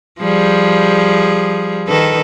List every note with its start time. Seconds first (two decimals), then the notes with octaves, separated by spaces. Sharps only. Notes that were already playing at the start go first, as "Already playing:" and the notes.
0.20 F3 G3 G#4
1.88 D#3 A4 B4